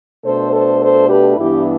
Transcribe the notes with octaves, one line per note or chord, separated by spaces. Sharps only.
B2 A3 D4 A4 C5
A4 C5
A4 C5
G4 B4
G2 E3 B3 D4 E4 G4